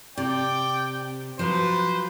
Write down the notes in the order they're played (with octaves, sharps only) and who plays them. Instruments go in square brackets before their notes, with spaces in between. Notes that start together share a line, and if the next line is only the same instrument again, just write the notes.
[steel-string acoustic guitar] C3 [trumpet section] D5 G5
[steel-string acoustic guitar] F3 F#3 [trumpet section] B4 C5